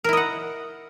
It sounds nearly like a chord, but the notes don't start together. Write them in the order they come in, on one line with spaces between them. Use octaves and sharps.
A#4 E4 D#5 F#5